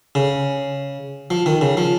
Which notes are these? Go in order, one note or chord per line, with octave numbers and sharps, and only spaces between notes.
C#3
F3
D#3
C#3
F3